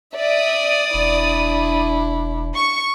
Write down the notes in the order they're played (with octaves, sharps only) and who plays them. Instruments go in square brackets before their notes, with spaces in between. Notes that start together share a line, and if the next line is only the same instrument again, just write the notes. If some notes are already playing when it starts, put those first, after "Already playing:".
[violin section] D5 D#6 [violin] E5
[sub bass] E1 [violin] D4 E4
[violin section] C#6